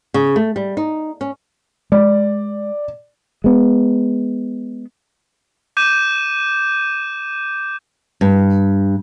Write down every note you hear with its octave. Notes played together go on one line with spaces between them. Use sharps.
C#3
A3
G3
D#4
C#4
G#3 D5
G#3 B3
D6 G6 D#7 E7
G2